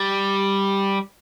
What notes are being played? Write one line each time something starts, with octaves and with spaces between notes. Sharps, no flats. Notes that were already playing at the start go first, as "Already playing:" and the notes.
Already playing: G3